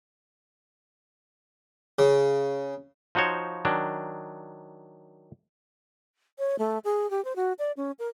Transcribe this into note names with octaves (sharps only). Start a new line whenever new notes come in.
C#3
F3 D#4 F#4 C5 C#5
D#3 F#3 D4
C#5
A3
G#4
G4
C5
F#4
D5
C#4
A#4